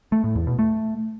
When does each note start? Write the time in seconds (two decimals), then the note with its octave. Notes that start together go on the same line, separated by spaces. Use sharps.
0.12 A3
0.24 A2
0.35 E2
0.47 B2
0.59 A3